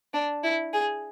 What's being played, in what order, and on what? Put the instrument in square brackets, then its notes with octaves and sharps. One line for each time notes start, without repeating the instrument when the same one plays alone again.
[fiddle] D4
E4
G#4